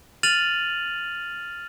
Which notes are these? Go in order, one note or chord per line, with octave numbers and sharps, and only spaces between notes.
F6 A6 D#7 F7 F#7